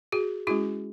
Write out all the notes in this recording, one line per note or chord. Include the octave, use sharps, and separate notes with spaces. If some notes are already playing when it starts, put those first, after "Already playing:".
F#4 G#4
G#3 C#4 E4 F#4 G#4